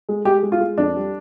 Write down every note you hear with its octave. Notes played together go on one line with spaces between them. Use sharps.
G#3
G#3 G4
G#3
F4
G#3
F2 D4
G3